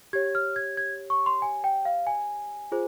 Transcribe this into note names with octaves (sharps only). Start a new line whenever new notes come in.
G4 C#5 G#6
F6
G#6
G#6
C#6
C6
G#5
G5
F5
G#5
F4 G#4 C5